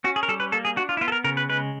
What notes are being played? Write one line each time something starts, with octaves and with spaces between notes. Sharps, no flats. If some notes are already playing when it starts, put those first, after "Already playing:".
C#4 F#4
G#4
A#4
G3 A4
B4
A#3 A4
G#4
D4 F#4
F4
E4
B3 F4
A4
A#4
C#3 A#4
B4
G#3 B4